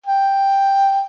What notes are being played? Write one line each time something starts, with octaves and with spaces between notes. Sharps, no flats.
G5